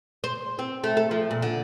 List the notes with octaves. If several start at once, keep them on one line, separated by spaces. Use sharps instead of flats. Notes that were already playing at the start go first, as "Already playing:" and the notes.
C5
C4
A3
A4
F3
A#2
D3